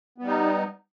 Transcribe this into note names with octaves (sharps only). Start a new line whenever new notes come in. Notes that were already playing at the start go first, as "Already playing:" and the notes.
G3 B3 D#4